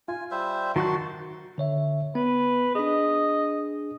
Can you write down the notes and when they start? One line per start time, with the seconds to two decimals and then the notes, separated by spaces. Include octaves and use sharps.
0.08 F4 G#5
0.31 G3 C5 E5
0.76 D#3 F#3 F#4 A5 C6 F#6
1.58 D3 C#5 E5
2.15 B3 B4
2.75 D4 G#4 D#5